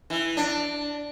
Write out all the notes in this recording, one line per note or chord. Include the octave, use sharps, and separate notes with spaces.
E3
D4